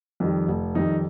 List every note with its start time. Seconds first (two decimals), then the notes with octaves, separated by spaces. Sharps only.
0.20 F2 D#3 G3
0.48 F1
0.75 F2 D#3 G3 D#4